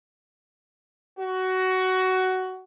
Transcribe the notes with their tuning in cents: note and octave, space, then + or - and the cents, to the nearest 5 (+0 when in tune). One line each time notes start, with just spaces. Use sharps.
F#4 +15